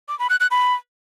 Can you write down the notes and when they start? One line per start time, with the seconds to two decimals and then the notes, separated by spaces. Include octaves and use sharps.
0.08 D6
0.19 B5
0.30 F#6
0.40 F#6
0.51 B5